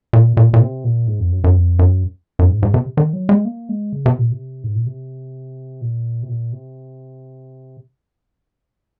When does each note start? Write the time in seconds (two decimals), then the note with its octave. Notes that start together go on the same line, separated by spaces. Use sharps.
0.13 A#2
0.37 A#2
0.54 A#2
0.61 C3
0.84 A#2
1.07 G#2
1.20 F2
1.32 F#2
1.44 F#2
1.56 F2
1.79 F#2
2.39 F#2
2.50 G#2
2.63 G#2
2.74 C3
2.97 D#3
3.13 F#3
3.29 G#3
3.45 A#3
3.69 G#3
3.93 C#3
4.06 C3
4.19 A#2
4.32 C3
4.64 G#2
4.75 A#2
4.87 C3
5.81 A#2
6.23 C3
6.29 A#2
6.53 C3